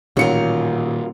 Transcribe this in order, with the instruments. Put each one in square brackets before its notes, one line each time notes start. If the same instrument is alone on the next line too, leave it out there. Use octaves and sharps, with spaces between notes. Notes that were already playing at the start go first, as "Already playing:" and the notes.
[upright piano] A1 C#7 [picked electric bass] A#2 D#3 [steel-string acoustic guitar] F#3 F4 A#4